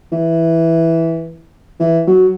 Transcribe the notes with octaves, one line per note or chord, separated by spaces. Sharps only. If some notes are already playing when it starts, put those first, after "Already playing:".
E3
E3
F#3